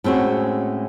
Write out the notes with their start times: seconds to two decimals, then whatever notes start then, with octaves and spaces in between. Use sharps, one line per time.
0.04 A2 G#3 C4 C#4 F#4